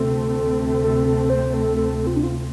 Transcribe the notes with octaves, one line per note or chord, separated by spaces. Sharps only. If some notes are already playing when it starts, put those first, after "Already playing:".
Already playing: D2 C3 A3 C4 A4
A4
A4
C5
A4
A4
F4
D4
F4